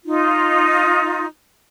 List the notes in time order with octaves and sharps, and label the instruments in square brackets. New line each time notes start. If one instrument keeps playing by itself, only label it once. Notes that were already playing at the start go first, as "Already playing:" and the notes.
[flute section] D#4 F4